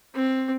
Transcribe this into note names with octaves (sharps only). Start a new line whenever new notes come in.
C4